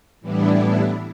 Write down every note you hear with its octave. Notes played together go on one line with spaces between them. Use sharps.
A2 E3 G3 B3 D4 E4